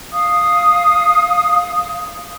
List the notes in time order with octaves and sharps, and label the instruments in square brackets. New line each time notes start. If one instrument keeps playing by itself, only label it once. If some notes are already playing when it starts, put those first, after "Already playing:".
[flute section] F5 D#6